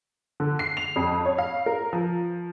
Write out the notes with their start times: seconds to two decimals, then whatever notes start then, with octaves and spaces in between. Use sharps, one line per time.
0.40 D3
0.59 C7
0.77 F7
0.96 F2
1.26 C#5
1.38 F5
1.66 A#4
1.93 F3